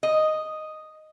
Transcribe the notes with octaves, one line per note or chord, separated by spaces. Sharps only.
D#5